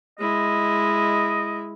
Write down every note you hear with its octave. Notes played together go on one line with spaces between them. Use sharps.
G#3 E4 D#5